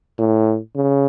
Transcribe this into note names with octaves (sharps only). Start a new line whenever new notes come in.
A2
C#3